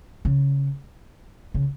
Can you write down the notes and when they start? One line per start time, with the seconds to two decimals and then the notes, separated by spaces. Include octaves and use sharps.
0.25 C#3
1.54 C#3